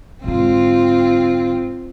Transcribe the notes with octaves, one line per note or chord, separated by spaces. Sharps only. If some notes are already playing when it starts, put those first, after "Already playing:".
G#2 D3 C4 F4